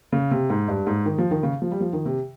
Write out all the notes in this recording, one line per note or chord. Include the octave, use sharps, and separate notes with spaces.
C#3
C3
G#2
G2
G#2
D#3
F3
D#3
C#3
F3
G3
F3
D#3
C3